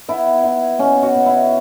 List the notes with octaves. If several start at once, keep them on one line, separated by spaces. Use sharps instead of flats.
B3 E4
B3 E4
B2 C#4
F#4
B2
E4